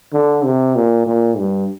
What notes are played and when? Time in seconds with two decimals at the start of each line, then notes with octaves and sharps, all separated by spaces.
0.13 D3
0.44 C3
0.76 A#2
1.06 A#2
1.38 G2